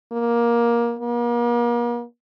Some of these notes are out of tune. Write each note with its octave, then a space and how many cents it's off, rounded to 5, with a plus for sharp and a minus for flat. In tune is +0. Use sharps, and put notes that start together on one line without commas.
A#3 +15
A#3 +40